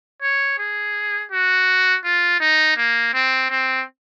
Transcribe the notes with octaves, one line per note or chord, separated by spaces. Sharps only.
C#5
G#4
F#4
F4
D#4
A#3
C4
C4